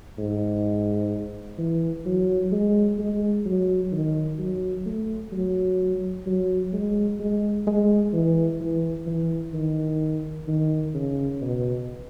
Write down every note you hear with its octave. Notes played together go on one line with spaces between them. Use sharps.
G#2
E3
F#3
G#3
G#3
F#3
D#3
F#3
A3
F#3
F#3
G#3
G#3
G#3
E3
E3
E3
D#3
D#3
C#3
B2